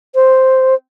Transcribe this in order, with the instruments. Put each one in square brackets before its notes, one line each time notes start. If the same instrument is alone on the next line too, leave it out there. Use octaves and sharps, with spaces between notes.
[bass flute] C5